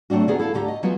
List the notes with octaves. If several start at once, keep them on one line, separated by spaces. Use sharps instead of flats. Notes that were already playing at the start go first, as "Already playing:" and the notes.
F#3 A3 C4 D4 F#4
D2 D3 B3 G#4 A#4 A#5
B3 E4 A4 F5 A5
D2 D3 G4 A#5
D#5
F3 F#3 G#3 B3 F4